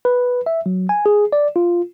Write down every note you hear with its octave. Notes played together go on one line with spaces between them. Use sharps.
B4
E5
F#3
G#5
G#4
D5
F4